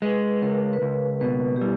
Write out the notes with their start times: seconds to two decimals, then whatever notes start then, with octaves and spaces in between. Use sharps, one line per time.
0.02 G#3 B4
0.42 C#2 A#4
0.73 B4
0.82 C#2 A#4
1.21 B2 B4
1.56 G4
1.61 G3 E4